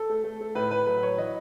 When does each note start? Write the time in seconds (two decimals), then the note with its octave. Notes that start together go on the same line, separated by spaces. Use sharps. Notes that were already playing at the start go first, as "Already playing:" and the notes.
Already playing: A4
0.09 A3
0.24 A3
0.41 A3
0.55 A2 B4
0.71 A2 B4
0.86 F#3 B4
1.02 F#3 C#5
1.18 E3 D#5